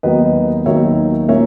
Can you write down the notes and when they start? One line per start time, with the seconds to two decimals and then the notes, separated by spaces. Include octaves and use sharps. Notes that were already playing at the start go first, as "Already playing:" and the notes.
0.03 D#2 D#3 F#3 B3 D#4 B4 D#5
0.66 D#2 D#3 F#3 B3 D#4 C#5 E5
1.28 A#2 A#3 C#4 C#5 E5